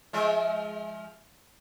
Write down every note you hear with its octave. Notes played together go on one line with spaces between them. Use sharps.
F3 G#3 E5